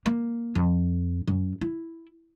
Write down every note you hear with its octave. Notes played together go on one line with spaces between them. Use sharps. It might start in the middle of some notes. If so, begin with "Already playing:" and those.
A#3
F2
F#2
E4